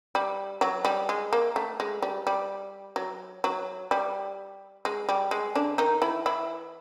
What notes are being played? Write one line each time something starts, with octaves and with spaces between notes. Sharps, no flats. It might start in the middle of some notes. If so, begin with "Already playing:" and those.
G3
F#3
G3
G#3
A#3
A3
G#3
G3
G3
F#3
F#3
G3
G#3
G3
G#3
D3 D4
D#3 D#4
E3 E4
E3 E4